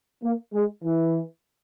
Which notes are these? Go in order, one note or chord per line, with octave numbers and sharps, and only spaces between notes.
A#3
G#3
E3